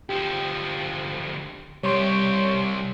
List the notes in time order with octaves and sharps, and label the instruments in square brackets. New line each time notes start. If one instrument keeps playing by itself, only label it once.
[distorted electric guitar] D2 F3 [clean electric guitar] G4
[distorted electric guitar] C2 G4 [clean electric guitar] G3 [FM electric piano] C#5 C6 C#6